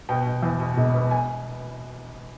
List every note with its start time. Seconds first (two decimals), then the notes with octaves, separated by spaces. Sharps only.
0.09 B2 G5
0.26 B2
0.43 E2
0.60 B2
0.78 E1
0.94 B2
1.11 G#5